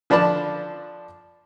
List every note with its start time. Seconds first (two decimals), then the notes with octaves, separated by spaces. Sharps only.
0.10 D3 F3 D4 B4 D5 A5